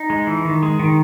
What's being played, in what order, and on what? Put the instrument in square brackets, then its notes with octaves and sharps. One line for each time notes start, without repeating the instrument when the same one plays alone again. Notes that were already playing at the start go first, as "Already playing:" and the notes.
Already playing: [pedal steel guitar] D#4
G#3
E3
D#3
G#3
D#3